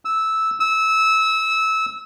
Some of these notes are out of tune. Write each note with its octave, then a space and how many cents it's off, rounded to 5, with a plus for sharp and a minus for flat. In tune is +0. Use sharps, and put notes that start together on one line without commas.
E6 -10
E6 -20